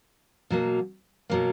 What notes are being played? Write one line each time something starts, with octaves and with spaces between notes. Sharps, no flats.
B2 F#3 A#3
B2 F#3 A#3